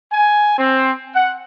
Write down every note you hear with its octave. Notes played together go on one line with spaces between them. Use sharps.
G#5
C4
F#5